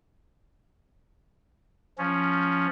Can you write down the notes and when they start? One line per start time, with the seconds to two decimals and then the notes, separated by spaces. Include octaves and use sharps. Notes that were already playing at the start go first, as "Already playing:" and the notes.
1.98 F3 C#4